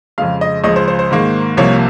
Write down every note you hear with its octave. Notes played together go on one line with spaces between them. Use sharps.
F2 C#3 G#3 F5
D#5
C#2 C#3 F3 D#5
C5
C5
C5
G#2 D#3 A#3
C2 C3 F3 A#3 C#5